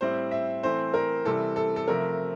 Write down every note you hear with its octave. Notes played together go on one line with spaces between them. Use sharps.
A2 G3 C4 E4 C5
E5
E3 A3 C4 C5
A#4
C3 E3 G3 A4
A4
A4
C3 F3 A3 A#4